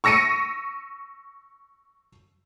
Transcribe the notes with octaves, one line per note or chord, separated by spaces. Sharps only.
C#6 E6 A#6 C#7 D#7